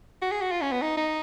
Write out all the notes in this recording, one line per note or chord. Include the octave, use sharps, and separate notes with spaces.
F#4
G#4
F#4
F4
C#4
B3
D#4
D#4